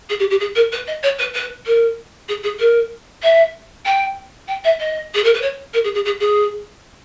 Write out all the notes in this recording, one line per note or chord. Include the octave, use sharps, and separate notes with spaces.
G#4
G4
G4
G#4
A#4
B4
D#5
C#5
B4
B4
A#4
G#4
G#4
A#4
E5
G5
G5
E5
D#5
G#4
A#4
B4
C#5
A#4
G#4
G#4
G#4
G#4